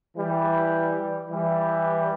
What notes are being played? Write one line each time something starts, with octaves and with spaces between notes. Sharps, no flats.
E3 G3
E3 G3